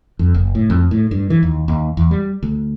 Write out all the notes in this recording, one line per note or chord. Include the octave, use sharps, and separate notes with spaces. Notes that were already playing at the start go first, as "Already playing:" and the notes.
F2
F#1
A2
F2
A2
G2
E3
D#2
D#2
E2
G3
D2